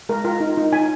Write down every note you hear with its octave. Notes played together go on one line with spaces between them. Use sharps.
G#3 A#4
F4 A#4
D#4
D#4
D#4 G#5